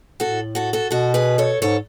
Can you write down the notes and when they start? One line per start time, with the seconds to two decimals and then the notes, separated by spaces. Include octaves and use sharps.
0.20 A2 F#4 A4
0.55 F#4 A4
0.73 F#4 A4
0.91 B2 F#4 A4
1.14 G#4 B4
1.38 A4 C#5
1.61 G#2 A4 C#5